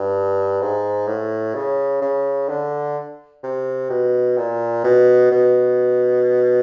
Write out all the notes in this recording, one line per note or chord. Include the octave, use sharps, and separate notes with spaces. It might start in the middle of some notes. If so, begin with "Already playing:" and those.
Already playing: G2
G#2
A2
C#3
C#3
D3
C3
B2
A#2
B2
B2